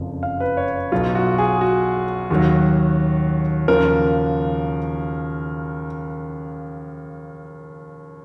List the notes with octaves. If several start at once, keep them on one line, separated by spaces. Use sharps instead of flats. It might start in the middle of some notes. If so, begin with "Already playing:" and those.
Already playing: F#1 F2 C#3 F3
F5
B4
C#5
B1 B2 F#3 F4
F#4
G#4
F#4
D#2 D#3 F#3
D#2 C#3 F3 A#4